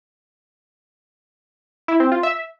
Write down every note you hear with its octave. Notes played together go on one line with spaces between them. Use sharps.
E4
C4
F4
E5